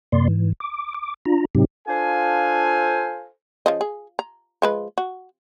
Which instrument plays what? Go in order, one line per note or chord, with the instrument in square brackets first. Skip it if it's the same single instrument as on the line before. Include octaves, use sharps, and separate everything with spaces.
[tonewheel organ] F#2 C3 A#3 D5 C6
G#2 E3
D6
D6
D4 F4 A#5
G#2 C3 F#3 C4 D#4 G4
[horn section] D4 F4 A4 C5 F5 G#5
[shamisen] C#3 F3 D#5
G#4
A#5
F3 G#3 B4
F#4